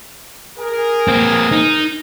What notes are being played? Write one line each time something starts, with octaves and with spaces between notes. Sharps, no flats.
G#4 A#4
A#3 C4
D#4